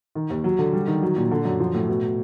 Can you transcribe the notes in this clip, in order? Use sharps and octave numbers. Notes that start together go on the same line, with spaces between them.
D#3
D#2
F#3
D3
G3
D#3
F#3
A#2
D3
F#2
F3
A2
B2